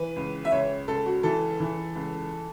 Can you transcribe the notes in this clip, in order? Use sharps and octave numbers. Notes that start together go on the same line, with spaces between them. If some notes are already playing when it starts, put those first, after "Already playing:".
Already playing: E3 B4
C#2
E5
C#2 C#5
C#2 A4
F#4
E3 A4
E3
C#2